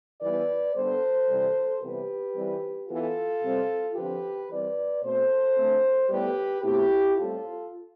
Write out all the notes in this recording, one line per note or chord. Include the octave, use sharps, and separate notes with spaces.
E3 G3 B3 B4 D5
D3 G3 B3 A4 C5
C3 E3 G3 C4
C3 E3 G3 B3 G4 B4
E3 G3 C4
E3 B3 F4 A4
C3 G3 C4
D3 F3 C4 G4 B4
E3 G3 C4 B4 D5
B2 A3 C4 A4 C5
D3 A3 C4
A2 G3 B3 G4 B4
B2 A3 C4 E4 G4
A2 G3 C4 F4 A4